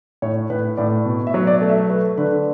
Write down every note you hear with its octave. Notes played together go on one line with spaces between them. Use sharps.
A2 C#5
A2 B4
A2 D5
B2
E5
F#3
D5
A3
E5
A3 B4
D3 B4